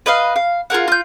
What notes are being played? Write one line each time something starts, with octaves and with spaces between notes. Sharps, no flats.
B4 D#5 F5
F5
F4 G#4 A#4 F#5
F4 G6